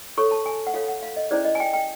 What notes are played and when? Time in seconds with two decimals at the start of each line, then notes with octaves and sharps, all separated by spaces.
0.17 F4 A4 C#5 C#6
0.31 A5
0.46 G#5
0.67 F#5
0.74 F4 A4 C#5 F5
0.88 F#5
1.03 F5
1.17 D#5
1.31 C#4 E4 G#4 C5 D5
1.45 D#5
1.55 G#5
1.60 G5
1.74 G5